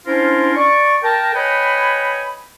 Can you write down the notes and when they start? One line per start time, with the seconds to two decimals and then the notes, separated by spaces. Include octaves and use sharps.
0.06 C#4 D4 E4 F4 A#4 C5
0.56 D5 C#6
1.03 A#4 G5 A5
1.34 B4 C#5 D#5 G5 G#5 B5